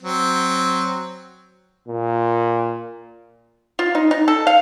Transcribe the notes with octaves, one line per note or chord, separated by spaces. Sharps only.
F#3 C4
A#2
F4
D#4
D#4
A4
F5